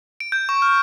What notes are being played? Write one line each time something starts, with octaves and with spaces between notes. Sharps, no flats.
D7
G6
C#6
F6